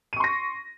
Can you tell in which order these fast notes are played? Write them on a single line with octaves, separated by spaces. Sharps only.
D#7 C#6 C6 A#6